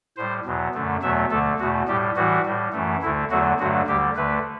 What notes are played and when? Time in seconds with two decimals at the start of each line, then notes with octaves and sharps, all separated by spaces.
0.17 A2 G3 C5
0.45 E2 B2 F#3
0.74 F#2 D3 A3
1.02 E2 B2 F#3 A3 E5
1.30 D2 D3 A3 A4
1.60 E2 B2 A3 F#4
1.88 A2 G3 G4
2.16 A2 E3 G3 F#4
2.46 A2 G3
2.73 F#2 E3 A3
3.02 D2 D3 A3 E4
3.30 E2 D3 F#3 A3 F#4
3.59 G2 D3 F#3 A3 F#4
3.87 D2 D3 G3 G4
4.16 D2 D3 A3 B4